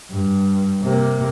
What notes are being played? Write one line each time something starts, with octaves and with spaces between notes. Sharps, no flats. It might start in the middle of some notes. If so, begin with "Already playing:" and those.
G2
C3 A#3